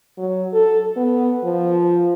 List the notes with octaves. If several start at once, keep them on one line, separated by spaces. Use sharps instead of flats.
F#3
A4
B3
F3